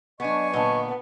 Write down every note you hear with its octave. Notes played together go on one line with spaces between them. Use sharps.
F#3 B3 D4 D#5 G#5 C#6
A#2 D3 B3 D#5